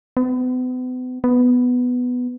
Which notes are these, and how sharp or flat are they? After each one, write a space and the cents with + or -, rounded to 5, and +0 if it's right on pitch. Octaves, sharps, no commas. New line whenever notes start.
B3 +40
B3 +5